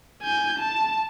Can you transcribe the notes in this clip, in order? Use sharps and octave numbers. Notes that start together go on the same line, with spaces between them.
G#5 G6
A5